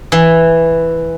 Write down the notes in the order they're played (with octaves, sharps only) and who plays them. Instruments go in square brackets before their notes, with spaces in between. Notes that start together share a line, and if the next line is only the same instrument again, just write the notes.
[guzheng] E3